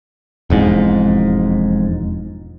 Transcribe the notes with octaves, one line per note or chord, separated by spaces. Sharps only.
E1 F2 G#2